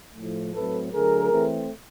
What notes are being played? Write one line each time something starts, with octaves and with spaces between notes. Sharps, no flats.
A2 F3 A3
A2 F#3 A3 C4 A4 B4
D3 F#3 A3 G#4 A#4
E3 A3 C4